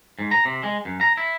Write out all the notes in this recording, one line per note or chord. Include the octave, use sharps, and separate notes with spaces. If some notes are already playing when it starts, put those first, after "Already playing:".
G#2
A#5
C3
G#3
F#2
A#5
E4